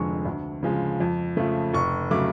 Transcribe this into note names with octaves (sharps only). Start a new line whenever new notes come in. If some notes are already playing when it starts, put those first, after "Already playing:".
Already playing: F1 F2 D3 G#3 C#6
D2
C#3 F3 G#3
F2
C#3 F3 A3
F1 C#6
C#3 F#3 A3 D6